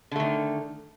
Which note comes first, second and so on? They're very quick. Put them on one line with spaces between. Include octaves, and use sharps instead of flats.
D3 A3 D#3